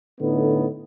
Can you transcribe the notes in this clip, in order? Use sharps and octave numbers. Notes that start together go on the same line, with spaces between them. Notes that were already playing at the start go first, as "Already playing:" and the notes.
A2 D3 B3 D#4